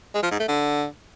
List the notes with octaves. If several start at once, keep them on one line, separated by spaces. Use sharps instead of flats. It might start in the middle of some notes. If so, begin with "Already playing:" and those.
G#3
F3
G#2
A3
D3